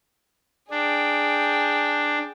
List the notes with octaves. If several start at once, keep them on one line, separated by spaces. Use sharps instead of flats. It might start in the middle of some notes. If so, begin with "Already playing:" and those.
D4 G#4 G5